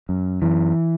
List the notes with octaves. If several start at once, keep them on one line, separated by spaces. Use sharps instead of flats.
F#2
F#2 E3